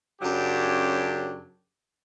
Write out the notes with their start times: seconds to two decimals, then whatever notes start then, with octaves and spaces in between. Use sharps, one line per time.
0.22 F#2 C#3 F#3 D4 G4